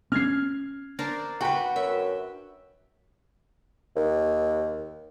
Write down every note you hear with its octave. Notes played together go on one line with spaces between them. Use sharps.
C4 C#4 F6 G#6 C7
D4 A#4 C5
F#4 B4 F#5 G5 B5
F#2 E5
D#2